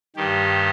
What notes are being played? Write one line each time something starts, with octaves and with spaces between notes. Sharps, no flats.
G2 D#3 G4